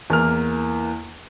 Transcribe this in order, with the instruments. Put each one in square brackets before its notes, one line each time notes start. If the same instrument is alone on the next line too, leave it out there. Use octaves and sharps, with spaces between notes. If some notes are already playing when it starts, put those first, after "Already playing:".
[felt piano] E2 A#3 F6